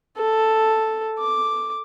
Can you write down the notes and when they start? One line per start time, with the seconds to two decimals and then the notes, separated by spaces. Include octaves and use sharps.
0.18 A4
1.19 D6